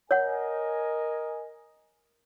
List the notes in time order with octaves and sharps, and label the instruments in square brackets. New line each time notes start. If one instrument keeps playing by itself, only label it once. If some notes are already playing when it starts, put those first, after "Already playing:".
[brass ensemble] A#4 D#5 G#5 [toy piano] C#5 F#5